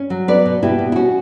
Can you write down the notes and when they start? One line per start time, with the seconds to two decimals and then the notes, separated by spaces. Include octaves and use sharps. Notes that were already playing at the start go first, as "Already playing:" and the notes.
Already playing: C#4
0.10 F#3
0.28 B3 B4 D5
0.46 B2
0.63 B2 E4 G4
0.79 B2
0.92 E4
0.96 C#4 F#4